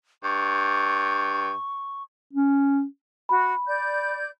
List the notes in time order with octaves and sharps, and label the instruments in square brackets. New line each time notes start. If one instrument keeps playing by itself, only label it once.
[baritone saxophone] G2 [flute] C#6
[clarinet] C#4
[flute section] F#4 [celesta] B5
[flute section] D5 G6